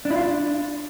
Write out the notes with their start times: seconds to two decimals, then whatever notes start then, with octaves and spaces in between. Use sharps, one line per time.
0.05 D4
0.10 E4
0.16 F4
0.21 D4